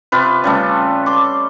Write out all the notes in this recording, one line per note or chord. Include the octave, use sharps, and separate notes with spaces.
C3 F4 B4
C#3 G3 A3
C6 D6